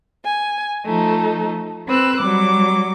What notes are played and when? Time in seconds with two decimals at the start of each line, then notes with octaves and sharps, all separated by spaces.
0.25 G#5
0.86 F3 A3 D#4
1.88 C4 B4 E6 F#6
2.21 F#3 G3 D6